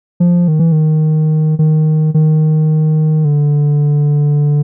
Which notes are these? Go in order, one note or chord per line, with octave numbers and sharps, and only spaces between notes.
F3
D#3
E3
D#3
D#3
D#3
D3